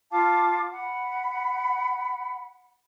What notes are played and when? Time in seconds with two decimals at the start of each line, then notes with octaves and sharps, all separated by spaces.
0.10 F4 F5 A5 D6
0.73 F#5 B5